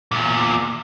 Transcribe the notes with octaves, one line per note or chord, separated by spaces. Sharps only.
E2 A#2